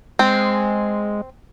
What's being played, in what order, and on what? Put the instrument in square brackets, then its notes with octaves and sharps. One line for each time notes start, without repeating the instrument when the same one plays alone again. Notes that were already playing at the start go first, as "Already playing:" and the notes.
[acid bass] G#3 [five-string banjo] C4